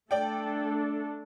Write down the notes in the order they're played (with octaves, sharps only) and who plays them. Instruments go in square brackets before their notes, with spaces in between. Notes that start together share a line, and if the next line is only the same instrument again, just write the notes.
[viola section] A3 D4 A4 [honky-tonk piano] D5 G5